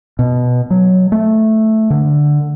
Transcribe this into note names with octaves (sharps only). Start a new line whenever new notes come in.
B2
F#3
A3
D3